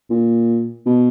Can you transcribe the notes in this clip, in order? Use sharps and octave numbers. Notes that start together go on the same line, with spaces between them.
A#2
B2